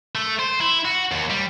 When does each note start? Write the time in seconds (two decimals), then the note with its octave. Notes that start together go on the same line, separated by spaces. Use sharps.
0.15 A3
0.39 C5
0.61 E4
0.85 F#4
1.12 D#2
1.30 G3